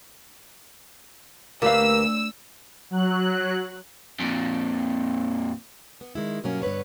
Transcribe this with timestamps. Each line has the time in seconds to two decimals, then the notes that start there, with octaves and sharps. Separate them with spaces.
1.62 D2 A#3 G4 B4 F5 E6
2.91 F#3 F#6
4.20 F2 A#2
6.01 B3
6.15 D#3 G#3 E4
6.44 G2 B2 F#3 A#3 C#4
6.62 G2 D3 B3 B4 C#5